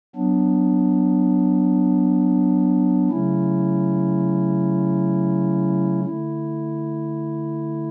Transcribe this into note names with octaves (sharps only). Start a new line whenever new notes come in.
F#3 B3 D4
C#3 F#3 A3 C#4 E4
D3 A3 E4